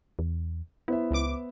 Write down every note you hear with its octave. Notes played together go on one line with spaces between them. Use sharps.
E2
B3 E4 C5 E5
C#2 D6